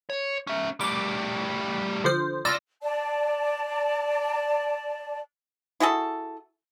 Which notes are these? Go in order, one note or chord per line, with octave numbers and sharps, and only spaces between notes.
C#5
C#4 E5
G3 A3 D6
D3 F3 C5
C#2 F4 D5 E6 A#6
D5 A5
E4 F#4 G#4 A4